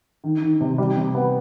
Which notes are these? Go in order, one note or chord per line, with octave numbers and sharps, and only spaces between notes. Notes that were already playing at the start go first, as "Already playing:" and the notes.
D#3
D#3
C3
G3
C3
B3